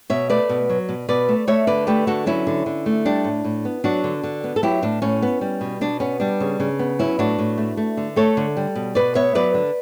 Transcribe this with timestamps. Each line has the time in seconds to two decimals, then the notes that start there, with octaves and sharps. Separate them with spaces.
0.10 B2 C#5 E5
0.30 A3 B4 D5
0.49 B2
0.69 F#3
0.89 B2
1.09 B2 B4 D5
1.28 A3
1.47 A3 C#5 E5
1.67 D3 B4 D5
1.87 A3 G4 B4
2.07 D3 F#4 A4
2.26 F#3 C#4 E4
2.47 D3
2.66 D3
2.86 A3
3.06 G3 D4
3.24 A2
3.44 A2
3.65 B3
3.84 F#3 D4 F#4
4.04 D3
4.24 D3
4.44 B3
4.56 A4
4.63 F#3 E4 G4
4.82 A2 D4
5.02 A2 C#4
5.22 B3
5.41 G3
5.61 B2
5.81 B2 D4
6.00 B3 C#4
6.20 G3 D4
6.40 C#3
6.60 C#3
6.79 B3
6.99 F#3 C#4 E4
7.19 A2 D4 F#4
7.39 A2
7.58 A3
7.77 A3
7.97 D3
8.16 A3 A4 C#5
8.37 D3
8.57 G3
8.75 B2
8.95 B2 B4 D5
9.15 B3 C#5 E5
9.35 F#3 B4 D5
9.54 D3